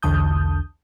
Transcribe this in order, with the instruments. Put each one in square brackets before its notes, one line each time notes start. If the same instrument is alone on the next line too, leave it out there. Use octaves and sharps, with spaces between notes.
[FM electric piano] B1 E2 D3 A5 D#6 G6